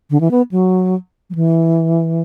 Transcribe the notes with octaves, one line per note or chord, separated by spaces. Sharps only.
D3
E3
B3
F#3
F#3
E3